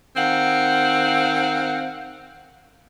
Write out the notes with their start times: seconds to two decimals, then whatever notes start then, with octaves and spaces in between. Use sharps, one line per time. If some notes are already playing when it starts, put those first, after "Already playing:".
0.17 D#3 C4 F5 F#5